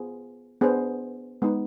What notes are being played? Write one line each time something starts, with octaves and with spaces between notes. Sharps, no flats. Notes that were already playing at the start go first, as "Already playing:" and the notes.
Already playing: B3 F4 G#4 C5
B3 D4 G#4 C5
G#3 B3 D#4